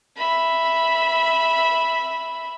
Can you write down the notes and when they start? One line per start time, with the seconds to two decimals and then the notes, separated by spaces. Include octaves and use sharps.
0.17 E5 B5